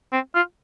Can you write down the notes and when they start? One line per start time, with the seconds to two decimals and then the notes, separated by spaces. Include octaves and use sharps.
0.12 C4
0.35 F4